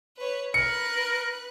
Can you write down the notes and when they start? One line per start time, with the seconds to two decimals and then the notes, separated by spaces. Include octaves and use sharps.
0.17 B4 C#5
0.54 A#4 B4 F#6 C#7